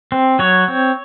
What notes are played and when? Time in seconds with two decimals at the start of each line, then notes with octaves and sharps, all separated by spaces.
0.12 C4
0.39 F#3 C#5
0.68 C4